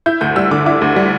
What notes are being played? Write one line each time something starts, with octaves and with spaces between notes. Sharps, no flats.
E4 G6
D2 G6
G3 E6
D3 D6
E4 D6
D2
G3